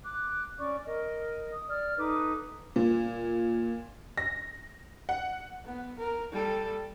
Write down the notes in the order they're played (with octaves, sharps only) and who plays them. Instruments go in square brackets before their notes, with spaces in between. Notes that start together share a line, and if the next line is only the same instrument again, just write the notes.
[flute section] D6 F#6
C#4 D5 C#6 D6
A#4 D#5
D#6
D5 F6
D#4 A4 B4 D6
[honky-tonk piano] A#2
A#6
F#5
[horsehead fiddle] B3
A#4
G3 A4